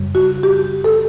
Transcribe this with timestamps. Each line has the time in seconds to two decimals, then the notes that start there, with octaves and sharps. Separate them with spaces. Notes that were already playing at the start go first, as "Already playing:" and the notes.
Already playing: F#2 C#3 G3
0.15 F#4
0.43 G4
0.84 A4